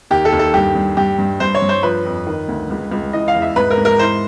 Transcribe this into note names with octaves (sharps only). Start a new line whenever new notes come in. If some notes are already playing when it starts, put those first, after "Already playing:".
D#2 G4
A4
D#2
A4
G2 G4
G2
G2 G4
G2
G2 C5
C#5
G2
C5
F3 B4
F2
D#3
D2
C#2
C#2
E3 D#5
F5
E2
E5
G#2 B4
A#4
G#2
A#4
E3 C5